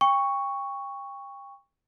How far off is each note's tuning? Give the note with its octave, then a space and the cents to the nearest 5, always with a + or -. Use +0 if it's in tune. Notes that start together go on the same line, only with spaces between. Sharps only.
G5 +30 C#6 +0